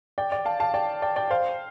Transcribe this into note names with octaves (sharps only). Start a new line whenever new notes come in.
D5 G5
D5 G5
F5 A5
F5 A5
D5 G5
D5 G5
D5 G5
C5 F5